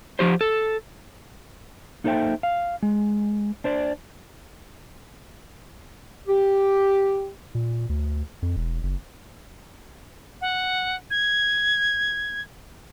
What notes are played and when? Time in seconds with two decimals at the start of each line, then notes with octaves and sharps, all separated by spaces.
0.19 F3 G4 C5
0.41 A4
2.04 A#3 D#4 A4 C5 E5 G5
2.43 F5
2.83 G#3
3.64 D4 C5 D5
6.27 G4
7.55 A#2
7.89 D2
8.42 F2
8.56 E1
8.83 F#1
10.41 F#5
11.11 G#6